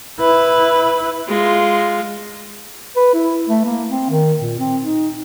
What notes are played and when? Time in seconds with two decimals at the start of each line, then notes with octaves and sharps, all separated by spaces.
0.20 E4 B4
1.28 G#3 F4
2.96 B4
3.14 E4
3.49 A3
3.66 A#3
3.89 C4
4.10 D#3
4.40 A#2
4.59 C4
4.83 D#4